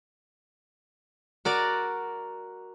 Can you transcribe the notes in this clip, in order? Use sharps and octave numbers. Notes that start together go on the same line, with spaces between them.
F#4 A#4 D5